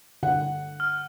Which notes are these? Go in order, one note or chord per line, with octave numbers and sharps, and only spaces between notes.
D3 F#5
F6